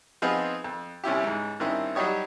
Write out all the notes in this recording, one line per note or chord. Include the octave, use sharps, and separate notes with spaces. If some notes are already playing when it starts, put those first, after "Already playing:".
F3 B3 C4 D#4 F4 G#4
F2
C2 C#4 E4 G4
C#2 G#2
G2 D#3 C4 C#4 E4
F#3 G3 D#4 G4 C#5 D#6